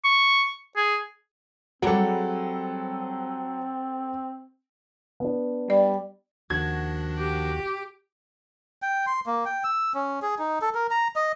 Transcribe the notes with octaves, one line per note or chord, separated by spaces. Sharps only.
C#6
G#4
F#3 G3 C4 G#4 A4 D5 F#5
B3 D4
G3 D5
D#2 D#3 F3 D4 F#4 G#6
G4
G5
C6
A#3
G5
E6
C#4
G#4
D#4
A4
A#4
A#5
D#5